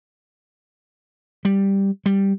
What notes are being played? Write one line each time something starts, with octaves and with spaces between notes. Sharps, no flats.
G3
G3